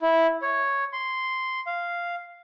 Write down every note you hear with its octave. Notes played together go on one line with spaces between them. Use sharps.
E4
C#5
C6
F5